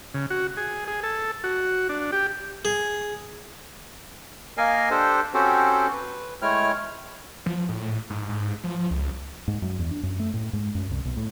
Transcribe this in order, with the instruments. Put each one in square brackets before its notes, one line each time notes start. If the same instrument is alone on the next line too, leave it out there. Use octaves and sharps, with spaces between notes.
[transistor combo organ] C#3
F#4
G#4
G#4
A4
F#4
D4
G4
[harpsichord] G#4
[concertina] A#3 A#4 D#5 F5 G#5
D4 G4 A4 C5
C4 C#4 F#4 G4 A4 C5
B4
G#3 A3 E4 C#5 G5 F6
[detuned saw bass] F3
A2
G#2
G#2
F3
C#2
[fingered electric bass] G#2
F#2
E2
D4
F#2
A3
A2
G#2
F#2
C2
B1
A2